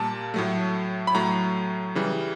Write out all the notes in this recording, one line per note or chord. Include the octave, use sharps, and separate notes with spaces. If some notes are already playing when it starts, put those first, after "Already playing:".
Already playing: A#2 G3 A#3 A5
A2 F#3 A3
B5
A2 F#3 A3 A#5
C#3 E3 G3